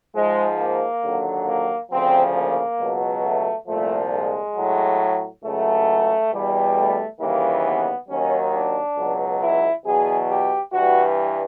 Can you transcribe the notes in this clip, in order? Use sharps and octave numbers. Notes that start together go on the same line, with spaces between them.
G#2 F3 G#3
A#3
D#2 D3 F#3
A#3
D2 C#3 F3 C4
A#3
C#2 B2 F#3
A3
C2 A#2 F3 A3
G#3
A2 F#3
C#2 C#3 F#3 A3
E2 B2 G3
A3
D#2 C#3 E3 G3 A#3
B3
D#2 D#3 F#3 C#4
D4
C#2 B2 F#3
E4
E2 B2 F#3 G#4
G4
G2 E3 G3 F#4